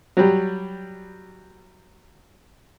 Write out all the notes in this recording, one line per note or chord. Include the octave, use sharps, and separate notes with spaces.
F#3 G3